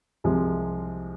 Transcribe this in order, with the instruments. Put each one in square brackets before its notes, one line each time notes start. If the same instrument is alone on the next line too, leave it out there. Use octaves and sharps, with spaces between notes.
[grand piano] C2 C3 F3 G#3